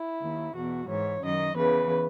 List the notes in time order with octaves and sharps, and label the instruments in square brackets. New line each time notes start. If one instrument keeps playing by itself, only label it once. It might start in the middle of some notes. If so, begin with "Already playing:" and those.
Already playing: [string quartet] E4
D#2 D#3
E2 B2 F#4
G#2 E3 C#5
F#2 D#3 D#5
E2 C#3 E3 B4